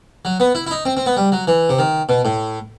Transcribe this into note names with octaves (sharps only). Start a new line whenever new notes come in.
F#3
B3
E4
E4
D#4
C4
C4
B3
G3
F#3
E3
C3
D#3
B2
A2